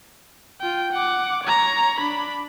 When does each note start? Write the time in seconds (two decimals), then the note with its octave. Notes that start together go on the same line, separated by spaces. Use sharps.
0.61 F4 G5
0.93 F#5 D6
1.44 C#5 A#5
1.99 D4 B5